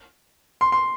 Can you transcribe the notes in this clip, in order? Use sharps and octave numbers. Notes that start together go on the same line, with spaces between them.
C6
C6